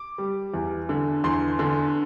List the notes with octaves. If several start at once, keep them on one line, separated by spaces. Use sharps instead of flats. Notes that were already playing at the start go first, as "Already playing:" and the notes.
Already playing: D6
G3
E2
D3
E2 C6
D3